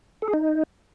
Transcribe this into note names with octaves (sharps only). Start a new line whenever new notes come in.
A4
G#4
D#4